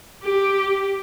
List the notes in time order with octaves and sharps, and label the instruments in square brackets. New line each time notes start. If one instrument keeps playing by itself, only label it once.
[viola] G4